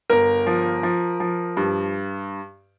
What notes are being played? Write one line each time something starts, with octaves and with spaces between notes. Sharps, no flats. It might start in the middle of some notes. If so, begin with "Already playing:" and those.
G1 A#4
F3
F3
F3
G2